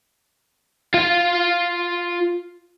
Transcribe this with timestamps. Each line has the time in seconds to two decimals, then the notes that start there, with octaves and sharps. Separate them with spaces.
0.94 F4 F5